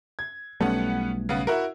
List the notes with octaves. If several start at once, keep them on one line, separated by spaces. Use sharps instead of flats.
G#6
B1 G3 A3 B3 C#4 F#5
C#3 B3
E4 F#4 A#4